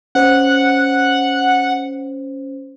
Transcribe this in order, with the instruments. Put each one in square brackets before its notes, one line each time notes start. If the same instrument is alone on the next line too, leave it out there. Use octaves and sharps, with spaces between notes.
[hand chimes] C#4 C5 [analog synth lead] F#5